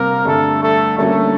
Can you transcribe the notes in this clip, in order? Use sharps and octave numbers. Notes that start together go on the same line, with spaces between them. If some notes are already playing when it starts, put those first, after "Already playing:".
Already playing: C3 G3 A#3 C4 A#4
G2 D3 G3 A3 A4
A3 A4
D3 G3 A3 A#3 C#4 F#4 A4